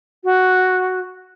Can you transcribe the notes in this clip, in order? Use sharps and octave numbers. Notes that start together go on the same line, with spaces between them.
F#4